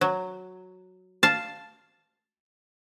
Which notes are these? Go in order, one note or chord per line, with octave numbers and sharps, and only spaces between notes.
F#3
F5 A5